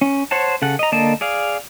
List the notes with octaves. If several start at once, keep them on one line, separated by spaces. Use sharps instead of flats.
C#4
C5 C#5 F#5 A5
C#3 A4 F#5
D#5 A#5
D3 A#3 D5 D#5 A5
G#4 D5 F5